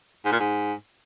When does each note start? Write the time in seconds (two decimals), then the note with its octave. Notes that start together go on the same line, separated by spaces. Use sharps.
0.25 G#2
0.32 A#2
0.40 G#2